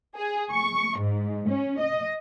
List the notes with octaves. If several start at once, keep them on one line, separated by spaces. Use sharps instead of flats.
G#4
C#6
G#2
C#4
D#5